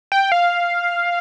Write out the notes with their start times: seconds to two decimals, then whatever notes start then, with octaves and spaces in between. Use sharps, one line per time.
0.12 G5
0.32 F5